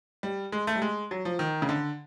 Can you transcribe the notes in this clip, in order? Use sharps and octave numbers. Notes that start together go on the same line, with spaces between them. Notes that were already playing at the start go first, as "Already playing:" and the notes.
G3
G#3
A3
G3
G#3
F#3
F3
D#3
C#3
D3